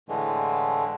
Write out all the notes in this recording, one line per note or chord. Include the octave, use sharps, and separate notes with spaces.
A2 D3 E3 G#3 A3